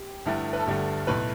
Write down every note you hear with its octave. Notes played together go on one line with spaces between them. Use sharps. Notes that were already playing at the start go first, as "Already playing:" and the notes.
Already playing: G4
G1 G2 D3 A3 E4
B4
A4
G1 G2 D3 A3 G4
B1 A2 A3 B4